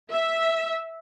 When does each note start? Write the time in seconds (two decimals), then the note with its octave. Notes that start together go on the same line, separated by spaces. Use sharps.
0.11 E5